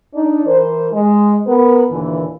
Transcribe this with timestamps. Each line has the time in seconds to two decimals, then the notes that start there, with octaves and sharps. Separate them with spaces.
0.14 D4 D#4 D5
0.46 E3 A#4 C5
0.93 G#3
1.47 B3 A#4 B4
1.91 D#2 A#2 D3 E3